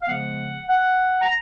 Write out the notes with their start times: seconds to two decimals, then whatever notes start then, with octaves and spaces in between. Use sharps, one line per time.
0.02 F5
0.08 C#3 F3 G#3 B3 F#5
0.68 F#5
1.22 A#5